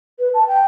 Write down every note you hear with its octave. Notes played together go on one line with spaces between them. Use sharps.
B4
A5
G5